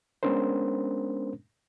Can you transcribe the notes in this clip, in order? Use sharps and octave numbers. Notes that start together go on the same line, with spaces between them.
G#3 B3 C#4 D4 A#4 C5